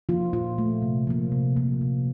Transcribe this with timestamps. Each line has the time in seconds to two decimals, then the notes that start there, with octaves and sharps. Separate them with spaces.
0.09 F3 A#3 F4
0.33 A#2 F4
0.58 A3
0.82 C3
1.07 F3 A#3
1.32 C3
1.57 F3 A#3
1.81 C3